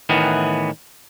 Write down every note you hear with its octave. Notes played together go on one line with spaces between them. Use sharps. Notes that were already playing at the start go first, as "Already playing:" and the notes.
A2 D#3 E3 B3